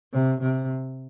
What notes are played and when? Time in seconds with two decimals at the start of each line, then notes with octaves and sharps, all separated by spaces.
0.12 C3
0.42 C3